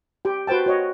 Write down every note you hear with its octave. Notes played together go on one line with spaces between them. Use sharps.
G4 G5
F#4 B4 C5 G5 A5
F#4 C#5 D#5